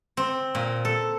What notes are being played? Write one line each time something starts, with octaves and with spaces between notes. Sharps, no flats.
C4
A#2
A4